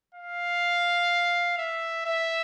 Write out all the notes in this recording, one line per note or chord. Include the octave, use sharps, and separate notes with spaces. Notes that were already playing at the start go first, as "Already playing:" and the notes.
F5
E5
E5